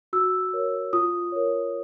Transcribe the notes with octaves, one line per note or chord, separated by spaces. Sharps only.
F#4 E6
A#4 C#5
F4 D#6
A#4 C#5